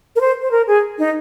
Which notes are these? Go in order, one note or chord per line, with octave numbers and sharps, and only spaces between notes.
A#4
C5
C5
A#4
G#4
D#4